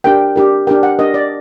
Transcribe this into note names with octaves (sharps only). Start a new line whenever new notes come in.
D4 G4 A#4 G5
D4 G4 A#4
D4 G4 A#4 G5
F#5
D4 G4 A#4 D#5
D5